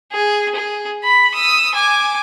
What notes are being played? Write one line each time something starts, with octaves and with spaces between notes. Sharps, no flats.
G#4
G#4
B5
D#6 E6
G#5 D6